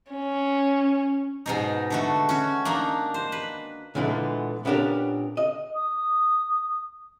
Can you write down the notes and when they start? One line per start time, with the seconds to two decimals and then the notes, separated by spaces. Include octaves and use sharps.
0.12 C#4
1.46 G#2 B2 D#4
1.90 D3 A3 F#4
2.29 C#4 F#4
2.65 A#3 D4 D#4
3.14 C5
3.32 B4
3.95 A#2 D3 E3 G#3 A3 B3
4.65 A#2 B3 C#4 D4 G4 A#4
5.37 D#5
5.75 D#6